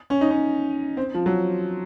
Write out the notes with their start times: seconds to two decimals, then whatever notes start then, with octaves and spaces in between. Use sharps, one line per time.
0.10 C#4
0.21 D#4
0.31 C#4
0.97 C4
1.15 F3
1.26 F#3